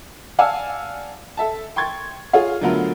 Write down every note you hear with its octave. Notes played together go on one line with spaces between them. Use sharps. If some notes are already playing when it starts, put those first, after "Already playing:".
D5 F5 F#5 G#5 A5 E6
A4 E5 A5
G5 C6 C#6 G#6 A6
F4 G#4 C#5 F5
D3 F#3 A3 B3 F4 A#4